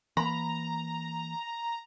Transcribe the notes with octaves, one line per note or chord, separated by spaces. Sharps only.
E3 A#3 A#5 B5